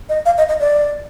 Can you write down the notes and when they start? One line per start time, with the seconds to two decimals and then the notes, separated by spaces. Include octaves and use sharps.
0.09 D#5
0.25 F5
0.38 D#5
0.48 D#5
0.60 D5